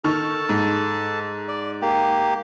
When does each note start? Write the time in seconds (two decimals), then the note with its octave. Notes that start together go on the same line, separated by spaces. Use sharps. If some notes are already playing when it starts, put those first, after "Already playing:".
0.04 D#3 A4 A5 C#6 F6
0.49 G#2
1.48 D5
1.82 A#3 G4